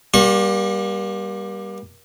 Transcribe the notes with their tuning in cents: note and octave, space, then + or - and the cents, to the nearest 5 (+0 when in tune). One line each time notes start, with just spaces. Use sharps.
G3 +0 A#3 +35 C#6 -40